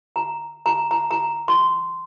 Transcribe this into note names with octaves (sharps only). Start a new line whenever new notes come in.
A#5
A#5
A#5
A#5
C6